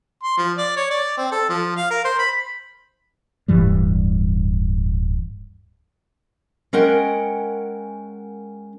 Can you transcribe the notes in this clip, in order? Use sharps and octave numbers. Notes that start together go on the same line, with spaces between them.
C6
F3
D5
C#5
D5
C4
A4
F3
F5
A#4
C5
B5
D1 G2 E3 G3
G#3 C#4 A#4 F#5 G5